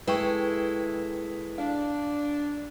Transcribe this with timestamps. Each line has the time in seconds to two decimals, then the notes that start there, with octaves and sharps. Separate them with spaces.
0.07 G#3 E4 A4 B4 G5 C#6
1.58 D4 F5